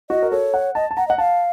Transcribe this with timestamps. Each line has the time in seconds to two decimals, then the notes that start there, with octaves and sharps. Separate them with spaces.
0.10 F#4 D#5
0.22 A#4
0.32 A4 C#5
0.54 F#5
0.75 D#5 A5
0.91 A5
0.97 F#5 A#5
1.08 D#5 F#5
1.18 F5 A5